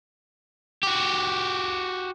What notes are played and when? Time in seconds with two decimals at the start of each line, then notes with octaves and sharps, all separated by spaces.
0.83 F#4 G4